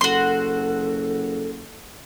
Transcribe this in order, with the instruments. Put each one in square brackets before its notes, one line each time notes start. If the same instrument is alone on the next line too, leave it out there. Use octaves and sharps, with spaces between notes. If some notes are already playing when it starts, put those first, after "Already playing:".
[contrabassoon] F#1 [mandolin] F#4 C6 [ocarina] A4